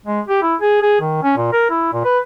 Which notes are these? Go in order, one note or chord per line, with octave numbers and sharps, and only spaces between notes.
G#3
G4
E4
G#4
G#4
D#3
C#4
A#2
A#4
E4
A#2
B4